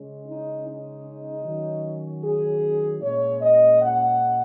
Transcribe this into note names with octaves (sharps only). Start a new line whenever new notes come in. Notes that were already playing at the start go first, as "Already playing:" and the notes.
Already playing: C#3 G#3 C#4
D#4
D#4
D#3 F#3 C#4
G#4
A#2 G#3 C#4 C#5
D#5
F#5